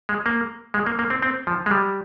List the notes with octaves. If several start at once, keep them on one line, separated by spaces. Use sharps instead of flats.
G#3
A#3
G#3
A#3
A#3
C4
C4
F3
G#3
G3